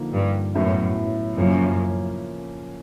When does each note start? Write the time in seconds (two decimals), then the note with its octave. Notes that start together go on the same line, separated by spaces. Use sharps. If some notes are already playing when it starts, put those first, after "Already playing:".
Already playing: D3 F3 A#3 D#4
0.13 G2
0.54 F#2 A2 F#3 B3 E4
1.36 F#2 C#3 F3 A#3 C#4 F4